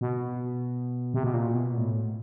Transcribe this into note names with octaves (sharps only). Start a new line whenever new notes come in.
B2
C3
B2
A#2
B2
A2